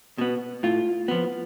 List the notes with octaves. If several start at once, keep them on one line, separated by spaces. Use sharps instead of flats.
B2 B3
A2 F4
F3 B3